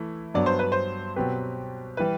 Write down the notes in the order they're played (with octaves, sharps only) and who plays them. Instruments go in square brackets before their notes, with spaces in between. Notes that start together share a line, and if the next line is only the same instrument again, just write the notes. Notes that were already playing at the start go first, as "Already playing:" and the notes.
Already playing: [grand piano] E3 A3 E4
[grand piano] G2 F#3 B3 [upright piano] D5
[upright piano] C5
B4
C5
[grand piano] B2 F#3 C4 G4 B4
[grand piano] E3 G3 [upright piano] B4